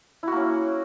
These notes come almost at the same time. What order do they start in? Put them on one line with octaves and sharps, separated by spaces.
E4 F#4 A#3 C#4